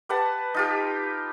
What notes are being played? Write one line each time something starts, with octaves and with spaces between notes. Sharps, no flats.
G4 B4 F#5 A5
D#4 F4 G4